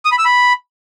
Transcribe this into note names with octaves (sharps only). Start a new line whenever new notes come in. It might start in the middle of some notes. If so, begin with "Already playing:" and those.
D#6
B5
E6
B5